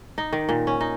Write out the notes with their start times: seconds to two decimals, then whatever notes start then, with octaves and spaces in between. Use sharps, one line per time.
0.18 D#4
0.33 D#3
0.49 A#2
0.67 C#4
0.81 D#4